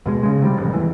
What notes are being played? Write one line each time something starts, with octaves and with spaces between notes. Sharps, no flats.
D#2 B2 G#3
C#3 G#3
C3 D#3 G3
A1 F2
E2 E3